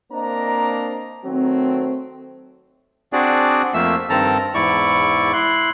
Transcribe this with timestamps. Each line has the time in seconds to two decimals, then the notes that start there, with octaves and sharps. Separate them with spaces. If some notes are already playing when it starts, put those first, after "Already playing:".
0.12 A#3 C4 D4 C5 D#5 A#5
1.24 D#3 F#3 A3 C4
3.13 C4 D4 F#4 G#4 D5
3.74 F2 F3 A3 A#3 E5 E6
4.10 G2 D#3 C4 A4 A5 A#5
4.54 E2 G#2 E4 D5 C#6
5.33 E4 C6 F#6